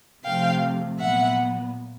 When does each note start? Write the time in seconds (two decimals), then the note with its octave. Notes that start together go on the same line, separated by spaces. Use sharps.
0.23 C3 F3 A3 F5 G5
0.98 A#2 F#3 B3 E5 F#5